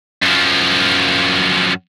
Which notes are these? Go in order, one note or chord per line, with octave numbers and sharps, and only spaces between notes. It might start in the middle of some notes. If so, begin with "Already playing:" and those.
F#2 F3